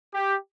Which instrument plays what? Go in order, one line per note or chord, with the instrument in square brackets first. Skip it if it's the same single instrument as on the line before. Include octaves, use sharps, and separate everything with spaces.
[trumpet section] G4